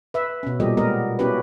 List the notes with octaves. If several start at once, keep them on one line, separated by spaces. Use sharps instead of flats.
B4 E5
B2 C#4
A#2 F3 G3 G4 A4 D#5
G#3 B3 A#4 D#5
B3 C#4 E4 F#4 G4 B4